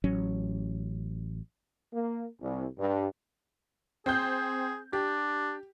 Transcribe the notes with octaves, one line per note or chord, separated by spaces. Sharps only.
A1 F#3 C#4
A#3
C2
G2
C4 G#4 G6
D4 G4